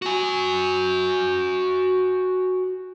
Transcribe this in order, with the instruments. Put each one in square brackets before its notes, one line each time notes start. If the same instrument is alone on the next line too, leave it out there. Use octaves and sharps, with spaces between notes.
[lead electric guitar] F#4 G#5